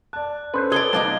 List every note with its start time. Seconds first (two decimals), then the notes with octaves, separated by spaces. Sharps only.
0.13 D5 A5 F#6
0.54 C#4 A4 B4 C5
0.72 G#4 A4 D5 D#6 G#6 G7
0.93 B1 D#4 D5 F5 A5 F#6